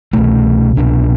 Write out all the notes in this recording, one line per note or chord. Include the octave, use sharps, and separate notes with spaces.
C2 B2 A3
C2 B2 D4